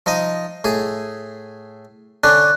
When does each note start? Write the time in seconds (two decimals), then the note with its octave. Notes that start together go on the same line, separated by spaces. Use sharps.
0.06 F3 D#4 D#5
0.64 A2 G#4
2.24 D3 C#4 D4 F#6